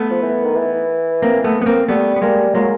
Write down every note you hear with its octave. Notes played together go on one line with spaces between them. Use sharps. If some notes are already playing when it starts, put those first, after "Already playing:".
Already playing: A3 B3
F3
E3
D#3
E3
A#3 C4
A3 B3
B3
A#3 C4
G3 A3 B3
B3
G3 G#3 A#3
F#3 G#3 A#3